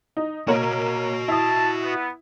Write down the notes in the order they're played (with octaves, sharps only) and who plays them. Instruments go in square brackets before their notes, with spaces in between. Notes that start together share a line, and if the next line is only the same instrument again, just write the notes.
[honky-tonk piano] D#4
[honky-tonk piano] A#3 A#4 C#5 [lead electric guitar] F#4 D#5
[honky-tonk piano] E4 D#6 [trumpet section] A5
[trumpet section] B3